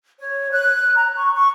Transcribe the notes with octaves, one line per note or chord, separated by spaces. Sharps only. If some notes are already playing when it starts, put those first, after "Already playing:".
C#5
F#6
A#5
C#6
C#6